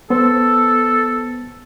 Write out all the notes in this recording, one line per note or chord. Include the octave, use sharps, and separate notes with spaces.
B3 A4 C5